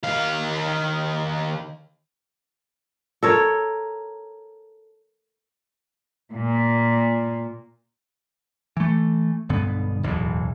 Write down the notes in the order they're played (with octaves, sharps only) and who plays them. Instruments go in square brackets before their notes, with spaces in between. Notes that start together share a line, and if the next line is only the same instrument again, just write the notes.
[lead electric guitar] D#3 F5
[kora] A4 A#4 C#5
[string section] A#2
[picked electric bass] E3 A3
B1 G2 D3 B3
D1 B1 E2